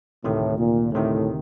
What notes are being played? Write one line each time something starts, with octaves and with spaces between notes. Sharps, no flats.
D2 A2 C3 D#3
A#2
D2 A2 C3 D#3